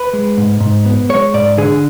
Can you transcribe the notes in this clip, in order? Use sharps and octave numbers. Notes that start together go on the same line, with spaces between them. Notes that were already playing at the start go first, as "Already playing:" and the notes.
Already playing: B4
G#3
G#2
G#2
B3
G#3 C#5
G#2 D5
D3 G#4